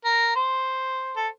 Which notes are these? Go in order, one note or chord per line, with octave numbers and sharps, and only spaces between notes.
A#4
C5
A4